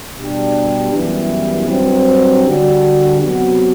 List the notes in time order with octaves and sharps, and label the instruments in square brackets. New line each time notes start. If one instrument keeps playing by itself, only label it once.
[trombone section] B2 G3 D4 G4
F#2 E3 G3 B3 E4
G2 F#3 C4
D3 G3 D4 F#4
C3 F#3 B3 F#4